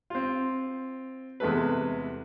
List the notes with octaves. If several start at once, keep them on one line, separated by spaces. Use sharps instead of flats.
C4 F4
E2 C3 G#3 A3 B4